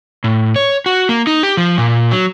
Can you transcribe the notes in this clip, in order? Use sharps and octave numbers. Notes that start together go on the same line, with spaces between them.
A2
C#5
F#4
A#3
D#4
G4
F3
A#2
F#3